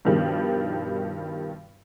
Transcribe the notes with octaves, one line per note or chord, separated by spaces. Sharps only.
G2 B2 D#3 F3 G3